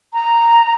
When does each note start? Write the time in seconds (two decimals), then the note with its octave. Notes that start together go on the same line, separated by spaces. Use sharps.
0.14 A#5